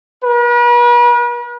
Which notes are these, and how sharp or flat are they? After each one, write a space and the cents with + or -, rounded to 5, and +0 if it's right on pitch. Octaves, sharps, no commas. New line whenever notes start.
B4 -45